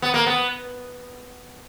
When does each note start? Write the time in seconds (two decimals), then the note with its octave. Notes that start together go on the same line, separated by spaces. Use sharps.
0.02 B3
0.14 A#3
0.26 B3